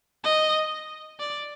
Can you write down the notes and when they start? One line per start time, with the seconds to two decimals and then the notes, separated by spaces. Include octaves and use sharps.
0.24 D#5
1.20 D5